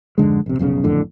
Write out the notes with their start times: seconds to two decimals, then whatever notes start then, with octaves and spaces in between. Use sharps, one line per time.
0.18 F2 G#2 D3 G#3
0.46 A#1 C3
0.59 F1 B1 G#2 C#3
0.84 F#1 F2 A2 D3